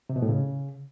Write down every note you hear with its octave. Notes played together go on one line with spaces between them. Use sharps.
C3
B2
A2
C#3